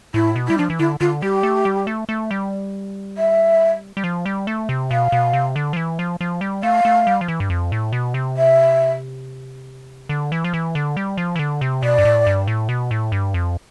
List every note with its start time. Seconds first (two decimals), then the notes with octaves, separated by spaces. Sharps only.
0.14 A2 E4
0.36 B2
0.47 G3 E4
0.57 F3 D4
0.70 E3
0.79 D3 E4
1.00 D3 F4
1.22 G3 G4
1.43 A3
1.65 G3
1.87 A3
2.09 A3
2.31 G3
3.17 E5
3.97 G3
4.04 F3
4.26 G3
4.47 A3
4.69 C3
4.91 B2 F5
5.12 B2
5.33 C3
5.56 D3
5.73 F3
5.76 E3
5.99 F3
6.21 F3
6.41 G3
6.63 A3 F5
6.85 A3
7.07 G3
7.21 F3
7.28 E3
7.40 G2
7.50 F2
7.72 A2
7.93 B2
8.14 C3
8.37 E5
10.09 D3
10.32 E3
10.44 F3
10.53 E3
10.75 D3
10.97 G3
11.17 F3
11.36 E3
11.39 D3
11.61 C3
11.83 B2 D5
11.98 G2
12.05 A2
12.27 G2
12.48 A2
12.69 B2
12.91 A2
13.12 G2
13.34 F2